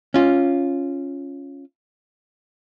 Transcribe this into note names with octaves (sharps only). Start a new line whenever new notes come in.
C#4 F4